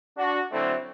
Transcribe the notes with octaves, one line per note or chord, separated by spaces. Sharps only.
D4 F#4
D3 F#3 A3 C4 E4